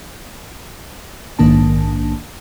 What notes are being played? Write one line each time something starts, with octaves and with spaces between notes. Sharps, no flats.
A#1 G#2 D#3 A#3 D4 A5